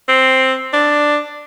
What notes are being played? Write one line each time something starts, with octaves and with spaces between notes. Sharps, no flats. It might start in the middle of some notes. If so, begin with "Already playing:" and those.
C4
D4